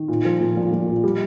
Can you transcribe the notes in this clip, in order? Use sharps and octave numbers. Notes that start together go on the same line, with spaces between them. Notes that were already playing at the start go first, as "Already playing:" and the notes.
Already playing: D#3
A#2
F3
A#2
A#1
A#1
A#2
G3